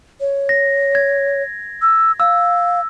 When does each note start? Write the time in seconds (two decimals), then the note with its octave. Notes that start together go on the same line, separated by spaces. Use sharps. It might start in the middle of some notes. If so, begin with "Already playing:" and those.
0.20 C#5
0.49 A#6
0.95 G#6
1.82 E6
2.20 F5 E6